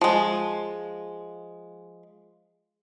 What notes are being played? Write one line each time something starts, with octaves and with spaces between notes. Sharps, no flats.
F3 G#3